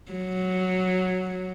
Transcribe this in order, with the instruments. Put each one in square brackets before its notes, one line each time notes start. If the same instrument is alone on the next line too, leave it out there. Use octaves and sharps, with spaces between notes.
[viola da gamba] F#3